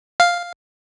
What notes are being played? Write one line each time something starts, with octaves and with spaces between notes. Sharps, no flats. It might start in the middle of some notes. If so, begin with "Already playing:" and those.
F5